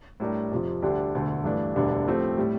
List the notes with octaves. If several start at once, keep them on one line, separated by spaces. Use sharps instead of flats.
A2 G3 D4 G4 A#4
F2 C3 F3
D2 D3 G3 D4 G4
E1 D2 D3 A3
G2 E3 A3 D4
E1 D2 D3 G3 D4
A2 F3 A3 C4 G4
A2 G3